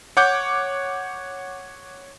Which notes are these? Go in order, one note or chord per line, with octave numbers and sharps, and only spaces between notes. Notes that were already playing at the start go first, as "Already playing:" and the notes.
C#5 F#5 D6 G6